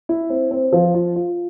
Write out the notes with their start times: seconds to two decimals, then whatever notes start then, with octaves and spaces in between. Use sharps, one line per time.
0.09 E4
0.30 C4
0.51 C4
0.72 F3
0.94 F4
1.16 F4